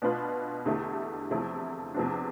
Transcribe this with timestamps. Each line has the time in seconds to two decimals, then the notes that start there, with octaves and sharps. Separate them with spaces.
0.02 B2 B3 D4 F4 B4
0.65 E2 D3 A3 E4 G4
1.31 E2 C3 F3 A3 E4
1.94 E2 C3 F3 B3 D4